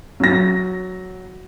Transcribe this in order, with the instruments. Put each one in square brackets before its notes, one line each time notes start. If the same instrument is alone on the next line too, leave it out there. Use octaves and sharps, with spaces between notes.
[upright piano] F#3 A#6